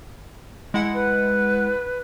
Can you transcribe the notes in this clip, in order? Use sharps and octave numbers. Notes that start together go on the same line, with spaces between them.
G#3 E4 F#5
B4